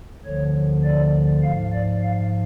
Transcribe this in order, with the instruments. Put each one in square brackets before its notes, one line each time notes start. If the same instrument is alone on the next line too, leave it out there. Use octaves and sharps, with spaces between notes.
[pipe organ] D2 D3 F3 C#5
D5
G#2 F3 F5
D5
F5